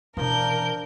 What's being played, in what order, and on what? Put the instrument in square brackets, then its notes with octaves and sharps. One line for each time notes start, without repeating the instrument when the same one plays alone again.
[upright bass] B2 E3 [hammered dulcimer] F3 D4 [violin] A#4 G6